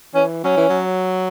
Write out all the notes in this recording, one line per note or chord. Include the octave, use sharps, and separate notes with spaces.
E3 C#4
F#3 C#4
E3
F#3